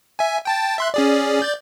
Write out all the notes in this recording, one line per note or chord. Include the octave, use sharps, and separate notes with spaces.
E5 G#5
G5 A5 A6
E5 C6 F#6
C#4 G#4 D5
D5 G6 A6